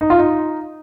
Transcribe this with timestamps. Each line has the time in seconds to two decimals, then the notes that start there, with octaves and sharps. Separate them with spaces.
0.01 D#4
0.10 F4
0.18 D#4